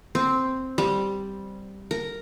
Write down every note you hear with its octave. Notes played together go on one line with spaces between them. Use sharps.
C4
G3
A#4